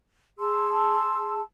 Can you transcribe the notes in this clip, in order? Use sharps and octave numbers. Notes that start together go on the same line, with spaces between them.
G#4 A5 C6 E6